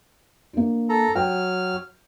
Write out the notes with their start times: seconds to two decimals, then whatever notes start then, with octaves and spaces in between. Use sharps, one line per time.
0.53 A#3 D4
0.89 A4 A#5
1.15 F#3 G5 F6